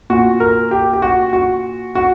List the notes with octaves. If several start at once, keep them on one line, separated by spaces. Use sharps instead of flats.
A#2 F#4
A#4
G4
G4
F#4
F#4
F#4